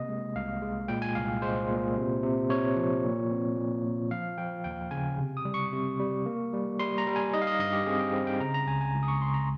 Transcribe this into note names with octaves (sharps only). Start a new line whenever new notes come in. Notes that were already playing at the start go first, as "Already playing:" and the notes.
Already playing: C3 A#3 D#5
G#3
C2 F5
G#3
A#2 G5
G#5
C2 F5
G#3 C5
A#2
C3
C3
C3 C#5
F3
A#2
C4
A#2
A#2
F3 F5
F3 G5
D#2 G5
C#3 G#5
C3
D#6
G3
C#6
C3
G3
A#3
G3
G3 C6
A#5
G3
G#5
D#4 D#5
F5
D#5
G2 D#5
G4
C4 G#4
G5
C4
G5
C#3 A#5
A#5
C#2 G#5
G#5
C#2
D#6
C#6
C#2 C6
A#5